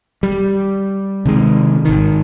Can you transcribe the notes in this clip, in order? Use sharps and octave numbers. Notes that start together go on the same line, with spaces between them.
G3
C3 D#3 G#3
G#1 D#3